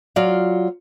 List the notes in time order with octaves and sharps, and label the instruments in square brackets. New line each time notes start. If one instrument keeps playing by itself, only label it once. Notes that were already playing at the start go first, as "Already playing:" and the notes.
[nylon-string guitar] F#3 F4 C#5 D5 F5